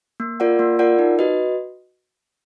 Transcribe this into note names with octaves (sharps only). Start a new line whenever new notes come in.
A#3
F4 A#4 D5 F#5
A#3
F4 A#4 D5 F#5
D#4
F#4 B4 D#5